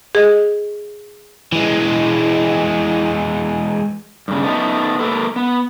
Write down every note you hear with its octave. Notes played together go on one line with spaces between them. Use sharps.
G#4 D#5
E3 G#3
G2 C#3
A3 B3 D#4
A#3 A4 B4
B3